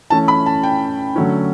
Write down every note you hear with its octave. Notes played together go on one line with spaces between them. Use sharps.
E3 A3 C#4 A5
B5
A5
G5
D3 F#3 A3 C#4